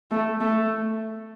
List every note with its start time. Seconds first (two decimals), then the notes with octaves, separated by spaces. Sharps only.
0.11 A3
0.41 A3